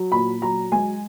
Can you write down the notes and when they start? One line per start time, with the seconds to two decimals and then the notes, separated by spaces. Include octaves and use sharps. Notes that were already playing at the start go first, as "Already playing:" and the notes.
Already playing: F#3
0.12 A#2 B5
0.42 F#3 A#5
0.72 G#3 G#5